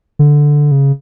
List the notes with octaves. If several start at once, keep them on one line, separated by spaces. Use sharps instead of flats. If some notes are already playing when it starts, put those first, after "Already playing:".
D3
C#3